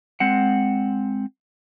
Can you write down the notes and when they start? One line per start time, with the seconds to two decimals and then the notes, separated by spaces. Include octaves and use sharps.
0.20 G#3 C4 F#5